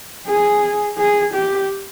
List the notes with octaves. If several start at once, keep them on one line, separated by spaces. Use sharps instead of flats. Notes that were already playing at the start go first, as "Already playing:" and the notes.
G#4
G#4
G4